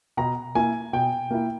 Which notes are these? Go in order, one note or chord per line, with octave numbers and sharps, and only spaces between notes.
B2 A#5
A#3 E4 G#5
B2 G5
A#3 E4